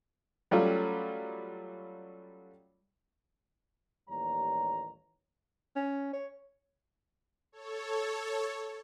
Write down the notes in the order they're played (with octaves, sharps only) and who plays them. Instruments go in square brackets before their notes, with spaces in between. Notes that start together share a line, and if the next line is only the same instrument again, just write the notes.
[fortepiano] F#3 G3 A3 C#4 F4
[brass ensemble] A1 D#2 G3 A#3 C#5 A#5
[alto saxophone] C#4
C#5
[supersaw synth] A4 C#5